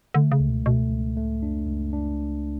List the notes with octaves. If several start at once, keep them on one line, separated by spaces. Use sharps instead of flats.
D3 A3
C#3
C#2
B2
B2 A3
C#2
A2 A3
F#2 D4
F2
C#2 F#2
D4